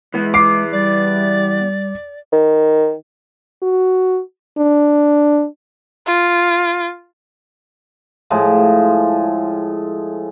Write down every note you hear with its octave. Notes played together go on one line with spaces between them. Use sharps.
E3 G#3 B3
D6 C7
G3 D5
D#3
F#4
D4
F4
A2 F3 G#3